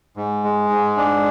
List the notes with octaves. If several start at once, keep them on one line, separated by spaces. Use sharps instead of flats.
G#2
G#3
G#2
D4